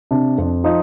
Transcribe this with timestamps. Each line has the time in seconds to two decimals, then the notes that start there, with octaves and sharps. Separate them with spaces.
0.11 C3 D4
0.38 F2
0.64 F3 D#4